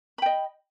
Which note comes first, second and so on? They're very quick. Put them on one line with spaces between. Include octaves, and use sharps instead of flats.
B5 G5 D#5